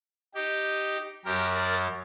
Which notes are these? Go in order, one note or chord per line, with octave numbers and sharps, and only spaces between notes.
D#4 G4
F#2 F#3 G4 A#4
A#4 D5